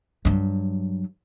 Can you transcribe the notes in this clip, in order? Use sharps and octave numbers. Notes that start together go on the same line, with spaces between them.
G2 F#3